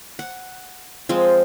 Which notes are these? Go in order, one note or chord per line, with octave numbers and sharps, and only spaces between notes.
F#5
F3 G#3 C4